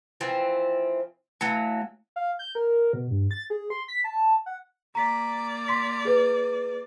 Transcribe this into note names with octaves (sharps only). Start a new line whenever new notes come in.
E3 F3 C4
E3 F#3 A3 F5
F5
G6
A#4
B2
G2
A6
G#4
C6
B6
A5
F#5
A#3 D5 A#5 B6
C6 B6
G#4 B4